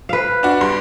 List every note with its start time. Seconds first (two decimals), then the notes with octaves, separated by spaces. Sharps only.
0.09 B4 F5
0.43 D4 F#4
0.61 G2 C6